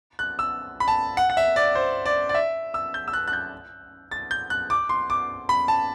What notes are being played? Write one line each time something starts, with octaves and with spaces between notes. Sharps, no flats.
F#6
E6
B5
A5
F#5
F#5
E5
D5
C5
D5
D5
E5
E6
G6
E6
F#6
F#6
G6
A6
G6
F#6
D6
C6
D6
B5
A5